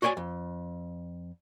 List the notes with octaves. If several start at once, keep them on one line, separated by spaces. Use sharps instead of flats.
F#4 C#5 D5 G5 G#5
F2